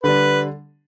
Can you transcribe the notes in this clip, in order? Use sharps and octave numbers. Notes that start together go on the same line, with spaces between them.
D3 G3 D4 B4